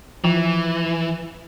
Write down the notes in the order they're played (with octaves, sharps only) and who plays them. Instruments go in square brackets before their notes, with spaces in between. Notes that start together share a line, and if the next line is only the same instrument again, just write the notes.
[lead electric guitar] E3 [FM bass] F3